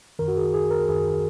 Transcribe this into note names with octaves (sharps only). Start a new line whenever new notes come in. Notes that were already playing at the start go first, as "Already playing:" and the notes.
F#2 D#3 A#4
F#4
G#4
G#4
A#4
F#2 D#3 G#4